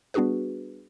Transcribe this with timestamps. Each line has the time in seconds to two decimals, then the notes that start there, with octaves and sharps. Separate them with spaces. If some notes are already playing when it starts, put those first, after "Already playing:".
0.14 G3 B3 D4 F#4 G#4 B4